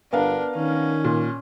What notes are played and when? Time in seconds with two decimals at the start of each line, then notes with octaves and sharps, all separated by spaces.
0.13 G1 B3 D4 A#4 F5
0.56 D#3 C#4
1.04 A#2